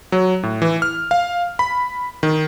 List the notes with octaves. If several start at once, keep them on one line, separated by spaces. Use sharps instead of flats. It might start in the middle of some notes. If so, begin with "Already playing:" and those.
F#3
A2
E3
F6
F5
B5
D#3